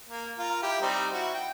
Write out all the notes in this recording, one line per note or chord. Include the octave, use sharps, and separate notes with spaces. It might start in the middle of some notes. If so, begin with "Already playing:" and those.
A#3
F4 A#4
E4 G4
G3 C4 D#4
E4 F#4
G5